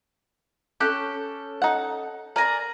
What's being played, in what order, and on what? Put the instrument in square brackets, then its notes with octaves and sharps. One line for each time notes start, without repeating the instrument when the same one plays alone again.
[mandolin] C#4 A4 F#6 [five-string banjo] G4
[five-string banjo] D#4 F#5
[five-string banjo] A#4 [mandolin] D5 G#5 A#5